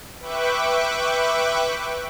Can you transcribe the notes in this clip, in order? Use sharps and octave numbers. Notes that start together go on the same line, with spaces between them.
B4 E5 G5 C#6 D6 F#6